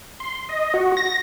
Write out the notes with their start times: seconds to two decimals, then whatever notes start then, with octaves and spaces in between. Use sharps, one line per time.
0.20 C6
0.49 D#5
0.74 F#4
0.97 A#6